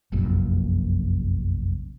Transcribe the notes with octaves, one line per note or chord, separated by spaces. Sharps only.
F1 A#1 F#2 A#2